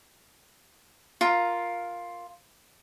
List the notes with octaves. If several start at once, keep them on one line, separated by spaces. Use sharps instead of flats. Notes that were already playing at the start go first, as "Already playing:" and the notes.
F4 A#4